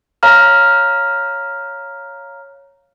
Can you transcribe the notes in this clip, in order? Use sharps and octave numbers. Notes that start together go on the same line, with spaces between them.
C#5 F5 A#5 F6